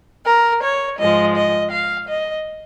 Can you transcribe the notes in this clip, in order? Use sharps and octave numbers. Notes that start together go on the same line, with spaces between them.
A#4
C#5
G#2 F3 G#3 D#5
D#5
F5
D#5